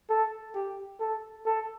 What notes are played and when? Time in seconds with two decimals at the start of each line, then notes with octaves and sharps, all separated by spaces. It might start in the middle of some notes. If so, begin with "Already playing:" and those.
0.10 A4
0.55 G4
1.00 A4
1.46 A4